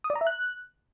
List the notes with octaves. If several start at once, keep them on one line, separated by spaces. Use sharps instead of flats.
D#6
D5
A#5
E5
F#6